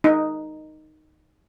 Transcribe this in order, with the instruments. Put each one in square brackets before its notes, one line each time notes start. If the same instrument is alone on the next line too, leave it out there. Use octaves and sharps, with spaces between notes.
[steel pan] D#4